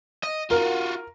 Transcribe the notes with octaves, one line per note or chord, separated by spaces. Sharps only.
D#5
F4 F#4 A#4